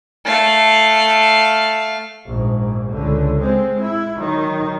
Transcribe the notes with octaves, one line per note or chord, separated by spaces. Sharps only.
A3 F5
A#1 G#2
C#2 D3
G#3 C4
E4
D#3 F#3